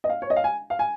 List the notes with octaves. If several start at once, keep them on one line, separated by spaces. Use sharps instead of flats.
D#5
F5
C#5
D#5
F5
G#5
F5
G#5